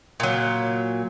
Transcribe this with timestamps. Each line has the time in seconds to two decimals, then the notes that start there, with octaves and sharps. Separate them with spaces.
0.20 A#2 F#3